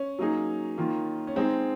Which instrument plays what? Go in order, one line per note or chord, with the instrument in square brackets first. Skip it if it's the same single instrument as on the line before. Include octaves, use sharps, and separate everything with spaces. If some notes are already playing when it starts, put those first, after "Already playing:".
Already playing: [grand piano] C#4
[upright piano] F#3 A#3 D#4 G#4
D#3 A#3 F4
[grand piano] C#4
[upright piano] G#3 D#4 G#4 [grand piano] C4